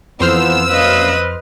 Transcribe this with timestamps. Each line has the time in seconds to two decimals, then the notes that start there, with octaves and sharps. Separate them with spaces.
0.20 F2 E3 F3 B3 C5 E6 F6
0.70 F#2 A#2 B4 D#5 F5 D#6